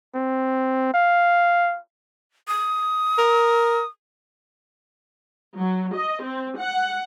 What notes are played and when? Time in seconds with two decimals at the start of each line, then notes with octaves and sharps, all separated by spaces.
0.15 C4
0.94 F5
2.48 D#6
3.18 A#4
5.57 F#3
5.95 D#5
6.24 C4
6.59 F#5